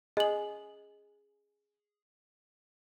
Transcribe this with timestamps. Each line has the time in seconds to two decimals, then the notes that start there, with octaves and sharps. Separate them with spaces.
0.17 G#4 D#5 F#7